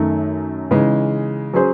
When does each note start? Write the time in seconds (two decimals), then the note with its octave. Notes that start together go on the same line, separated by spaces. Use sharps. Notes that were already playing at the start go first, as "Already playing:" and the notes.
Already playing: F#2 D#3 A3
0.71 C#3 E3 G#3 D#4
1.53 F#3 C#4 G#4 C5